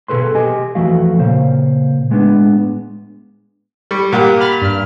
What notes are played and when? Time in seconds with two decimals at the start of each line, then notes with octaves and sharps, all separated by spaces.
0.08 B2 G#4 A4 B4 C6
0.35 G4 D#5 G#5
0.75 E2 F3 A3 F#4 F5
1.18 A#2 C#3 C5 F5
2.10 A2 G#3 B3 C#4 D4
3.91 G3 C#6
4.12 A#2 G4 F#5 D6
4.40 B5 F6 A6
4.61 G2 F6